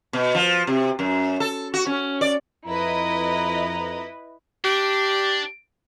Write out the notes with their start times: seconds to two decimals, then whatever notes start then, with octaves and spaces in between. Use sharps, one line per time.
0.13 B2
0.35 F3
0.67 C3
0.99 F#2
1.40 A4
1.74 F#4
1.86 C#4
2.21 D5
2.65 F2 E4 B4 D#5 A#5
4.64 D4 G4